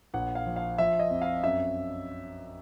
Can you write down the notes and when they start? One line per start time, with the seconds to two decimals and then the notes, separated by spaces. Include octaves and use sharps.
0.14 A#1 F#5
0.35 F5
0.46 F3
0.56 F5
0.78 F3 E5
0.99 D#5
1.10 F2
1.22 F5
1.44 F#2 E5